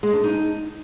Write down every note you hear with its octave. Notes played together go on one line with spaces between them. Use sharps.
G#3
D4
D#4